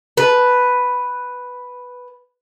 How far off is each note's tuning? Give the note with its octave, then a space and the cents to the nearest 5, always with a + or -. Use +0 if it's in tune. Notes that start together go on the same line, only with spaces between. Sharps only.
B4 +0 A5 -10